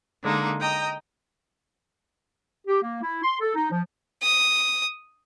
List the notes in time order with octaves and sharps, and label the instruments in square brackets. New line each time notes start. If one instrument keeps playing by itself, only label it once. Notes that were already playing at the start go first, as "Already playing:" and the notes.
[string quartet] D3 G#3 A#3 D#4
D#5 G5 A#5 D#6
[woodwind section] G4
A#3
E4
C6
A4
D#4
F3
[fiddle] D#6